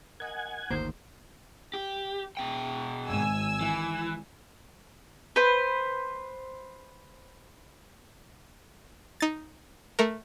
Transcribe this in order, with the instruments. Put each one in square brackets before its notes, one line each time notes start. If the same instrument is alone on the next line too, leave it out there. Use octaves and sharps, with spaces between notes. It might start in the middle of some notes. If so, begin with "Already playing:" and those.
[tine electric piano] A#4 D#5 [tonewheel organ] F#5 G#5 G#6
[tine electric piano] G1 D#3 [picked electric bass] D2 D3 A#3 [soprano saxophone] C5
[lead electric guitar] G4
B2 G5
[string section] G#1 G#5 E6
[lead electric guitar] E3
[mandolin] B4 C5
[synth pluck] D#4 A6
A3 A#4